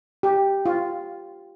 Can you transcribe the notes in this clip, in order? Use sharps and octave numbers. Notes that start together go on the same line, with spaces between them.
G4
F4